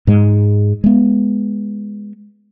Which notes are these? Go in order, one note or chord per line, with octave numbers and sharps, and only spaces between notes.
G#2 G#3
G#3 B3